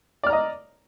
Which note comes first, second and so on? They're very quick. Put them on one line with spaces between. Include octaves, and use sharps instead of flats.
D5 F6 A#5 D#5